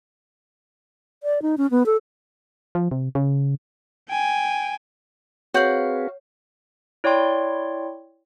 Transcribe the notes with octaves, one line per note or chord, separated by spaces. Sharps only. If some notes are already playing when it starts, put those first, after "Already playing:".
D5
D#4
C#4
B3
A4
F3
C3
C#3
G5 G#5
C4 F#4 G#4 B4 C#5 F5 G6 F#7
E4 C#5 D5 G5 C6